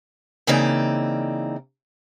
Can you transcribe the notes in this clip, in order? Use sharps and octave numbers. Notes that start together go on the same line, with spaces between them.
C#3 E3 A#3 C4 D#4 D5